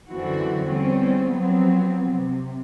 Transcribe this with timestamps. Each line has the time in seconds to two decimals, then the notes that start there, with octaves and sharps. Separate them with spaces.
0.11 F#2 D3 E3 C4 F#4
0.68 E2 G3 C4 C#4
1.30 F3 F#3 B3 C4
2.10 C3